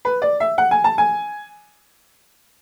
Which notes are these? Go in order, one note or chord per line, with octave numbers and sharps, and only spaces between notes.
B4
D5
E5
F#5
G#5
A5
G#5